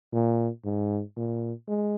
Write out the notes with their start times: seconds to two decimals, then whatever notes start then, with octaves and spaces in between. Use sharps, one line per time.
0.12 A#2
0.64 G#2
1.16 A#2
1.68 G#3